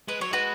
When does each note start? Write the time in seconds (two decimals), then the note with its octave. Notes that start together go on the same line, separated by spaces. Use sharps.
0.08 G#3 B4
0.20 F#3 C#5
0.31 G#3 F#4 B4